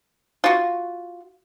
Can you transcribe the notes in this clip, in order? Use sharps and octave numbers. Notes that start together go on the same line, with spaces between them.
F4 F#4